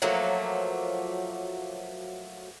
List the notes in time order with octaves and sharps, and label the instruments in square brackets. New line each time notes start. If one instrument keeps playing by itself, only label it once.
[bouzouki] F3 F#3 A3 A#3